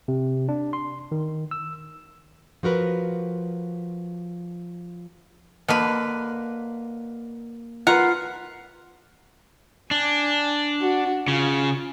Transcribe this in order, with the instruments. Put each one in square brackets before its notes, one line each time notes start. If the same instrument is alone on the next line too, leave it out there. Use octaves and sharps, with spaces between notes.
[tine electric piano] C3
D4
C6
D#3
E6
[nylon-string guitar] F3 F#4 A#4 B4
[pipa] B2 D3 B4 [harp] A#3
[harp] F4 B4 [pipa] A#4 F#5
[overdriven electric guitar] D4 [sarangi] G#5
[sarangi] F#4
[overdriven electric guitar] C#3 [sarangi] F4